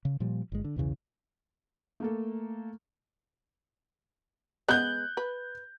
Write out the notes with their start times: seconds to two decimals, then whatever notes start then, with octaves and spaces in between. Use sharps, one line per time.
0.05 C#3
0.20 A#2 F3 G3
0.52 G1 G#3
0.64 D3
0.76 B1 E2 C#3 E3
2.00 A3 A#3 A4
4.68 G#3 B3 D#5 F#6 G6
5.17 B4